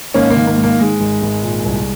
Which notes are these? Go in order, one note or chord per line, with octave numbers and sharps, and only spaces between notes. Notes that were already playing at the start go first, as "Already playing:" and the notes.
G#1 A#3 C#4
A#3
D#3
A#3
G#2
A#3
G#2 G#3
G#1
G#1
A#2
C2